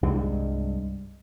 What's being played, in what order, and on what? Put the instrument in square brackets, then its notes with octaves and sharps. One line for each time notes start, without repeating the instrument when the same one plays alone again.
[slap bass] C2 G2 G3 G#3